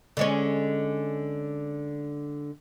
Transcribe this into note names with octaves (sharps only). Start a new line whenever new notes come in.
D3 G#3 C#4